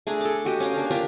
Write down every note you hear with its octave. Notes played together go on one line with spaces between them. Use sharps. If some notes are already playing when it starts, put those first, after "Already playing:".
A3 D4 G#4 A#5
A4 D6
F#4 G4 D#5
C#4 F5 G5 A#5
A#3 D4
D4 F4 G4 A#4